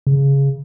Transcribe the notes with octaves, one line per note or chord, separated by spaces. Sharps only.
C#3